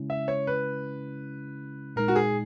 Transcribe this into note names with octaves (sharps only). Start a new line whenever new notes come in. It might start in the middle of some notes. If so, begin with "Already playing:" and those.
Already playing: C#3 G#3 C#4 E4
E5
C#5
B4
A#2 G#3 D#4 A#4
F#4
G#4